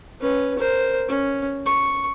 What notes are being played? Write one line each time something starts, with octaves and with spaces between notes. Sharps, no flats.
C#4 B4
A#4 C5
C#4
C#6